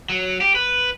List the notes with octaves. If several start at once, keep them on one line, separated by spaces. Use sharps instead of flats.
F#3
G4
B4